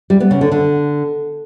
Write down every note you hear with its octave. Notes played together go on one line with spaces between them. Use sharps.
G3
B3
C#3
D3
D3